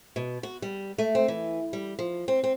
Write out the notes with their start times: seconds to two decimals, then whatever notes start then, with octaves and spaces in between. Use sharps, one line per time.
0.16 B2
0.43 F#4
0.62 G3
0.98 A3
1.15 C4
1.28 E3
1.73 G3
1.99 F3
2.28 C4
2.44 C4